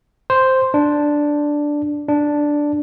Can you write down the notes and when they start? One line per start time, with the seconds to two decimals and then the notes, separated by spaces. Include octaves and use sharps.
0.30 C5
0.74 D4
2.09 D4